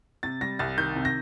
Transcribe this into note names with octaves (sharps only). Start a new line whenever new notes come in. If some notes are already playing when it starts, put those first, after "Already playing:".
C3 A6
G3 A#6
C2 A6
D#3 G6
C3
A#6